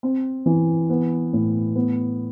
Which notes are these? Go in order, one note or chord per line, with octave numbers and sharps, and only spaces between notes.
C4
E3
B3
A2
B3